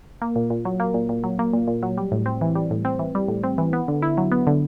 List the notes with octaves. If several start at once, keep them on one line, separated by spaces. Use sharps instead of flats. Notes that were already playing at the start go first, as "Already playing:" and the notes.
A#3
A#2
A#2
F#3
A#3
A#2
A#2
F#3
A#3
A#2
A#2
F#3
G3
A2
C4
E3
G3
A2
C4
E3
G3
A2
C4
E3
B3
D3
E4
F#3
B3
D3